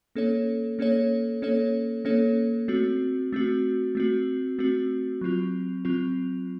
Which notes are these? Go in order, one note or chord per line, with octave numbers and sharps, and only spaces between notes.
A#3 C#4 A4 C#5
A#3 C#4 A4 C#5
A#3 C#4 A4 C#5
A#3 C#4 A4 C#5
A3 C4 F#4
A3 C4 F#4
A3 C4 F#4
A3 C4 F#4
F#3 C4 F4
F#3 C4 F4